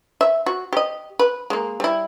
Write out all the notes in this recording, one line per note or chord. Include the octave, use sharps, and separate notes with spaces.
E5
F#4
G4 D#5
B4
G#3 A#3
G3 E4